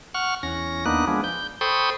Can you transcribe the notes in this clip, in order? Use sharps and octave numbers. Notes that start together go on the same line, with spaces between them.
F#5 C#6 F6
E2 C#4 A#6
D#2 A#3 B3 D4 D#4 F#6
F3 G#3 B3 D4
G6
A4 C5 G5 B5 C#6 D#6